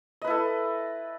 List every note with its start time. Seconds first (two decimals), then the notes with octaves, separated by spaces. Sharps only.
0.22 D#5
0.24 B4
0.27 E4
0.30 A4